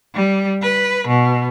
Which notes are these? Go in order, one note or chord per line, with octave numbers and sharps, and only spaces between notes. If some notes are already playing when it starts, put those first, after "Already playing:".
G3
B4
B2